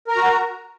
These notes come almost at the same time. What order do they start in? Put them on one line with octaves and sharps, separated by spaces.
A#4 A#5 F#4